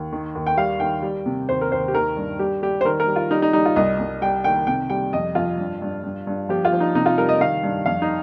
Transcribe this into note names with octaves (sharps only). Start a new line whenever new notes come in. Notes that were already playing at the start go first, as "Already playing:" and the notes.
Already playing: D#2
D#3
D#2
G5
G3 F5
D#3 G5
G3
C3
D#2 C5
A#4
D#2 C5
G4
D#3 A#4
G2
G3 G4
G3 G4
C5
D#3 A#4
A#4
G3
F4
G3 D#4
D#4
G3 D#4
F4
C2 D#5
C2
G3 G5
D#3 G5
C3 G5
G3 G5
F2 D#5
F2 F4
G2
G2
G2
G2
F3 G4
F4
F3
D#4
C3 D#4
F4
G3 A#4
D#5
D#3 F5
G2
F2 F5
D#4